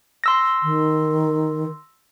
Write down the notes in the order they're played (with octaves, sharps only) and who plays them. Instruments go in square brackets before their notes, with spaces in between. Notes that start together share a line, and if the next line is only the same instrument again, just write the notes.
[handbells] C6 E6 A#6
[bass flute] D#3